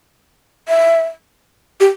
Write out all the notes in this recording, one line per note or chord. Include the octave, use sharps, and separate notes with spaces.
E5
G4